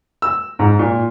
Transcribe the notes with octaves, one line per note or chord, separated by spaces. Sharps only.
E6
G#2
A#2